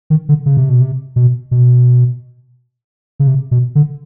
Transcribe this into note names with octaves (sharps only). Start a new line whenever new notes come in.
D#3
D3
C#3
C3
B2
C3
B2
B2
C#3
C3
B2
D3